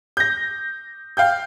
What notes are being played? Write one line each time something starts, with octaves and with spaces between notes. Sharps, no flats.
G6 A#6
F5 G5 G6